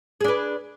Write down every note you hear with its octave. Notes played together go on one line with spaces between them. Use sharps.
D4 G#4 B4